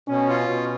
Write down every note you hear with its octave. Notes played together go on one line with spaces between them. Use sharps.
B2 C#4
F4
B2